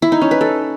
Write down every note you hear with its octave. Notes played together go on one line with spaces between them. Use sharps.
E4
D#4
C#4
B4
A4